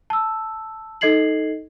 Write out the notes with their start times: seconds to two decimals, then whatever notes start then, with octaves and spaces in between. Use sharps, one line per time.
0.10 A5 E6
1.01 D#4 A4 D#5 G#6 C7 F#7